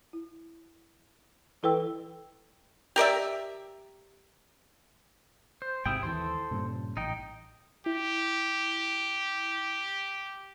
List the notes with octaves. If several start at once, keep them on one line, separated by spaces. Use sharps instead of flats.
E4
E3 E4 A4 B4 G5 E6
G4 A#4 D5 E5
C5
G#1 G#2 C3 E4 G#4 G5
D#2 D#3 E3 A4 C5
G2 A#2 C#3
A1 D#4 G5
E4 G4